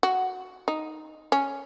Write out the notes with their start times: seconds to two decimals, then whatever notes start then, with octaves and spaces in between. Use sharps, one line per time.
0.03 F#4
0.68 D#4
1.32 C#4